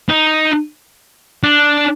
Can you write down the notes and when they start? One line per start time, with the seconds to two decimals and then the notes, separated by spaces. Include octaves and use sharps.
0.09 D#4
1.43 D4